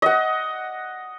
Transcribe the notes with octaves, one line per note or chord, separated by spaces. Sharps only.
D#5 F#5